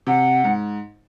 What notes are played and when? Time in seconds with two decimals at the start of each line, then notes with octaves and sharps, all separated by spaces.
0.07 C3 F#5
0.44 G#2